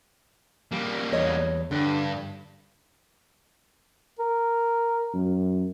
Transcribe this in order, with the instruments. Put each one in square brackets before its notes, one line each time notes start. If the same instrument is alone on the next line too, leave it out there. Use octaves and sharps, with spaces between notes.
[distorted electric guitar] G3 A#3
[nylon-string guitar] E2 C#5 D#5
[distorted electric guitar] G2 [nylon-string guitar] D3
[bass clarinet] A#4
[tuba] F#2